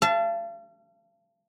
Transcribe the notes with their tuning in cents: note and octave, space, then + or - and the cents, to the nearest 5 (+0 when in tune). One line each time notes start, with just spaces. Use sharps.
F5 -40 A5 +0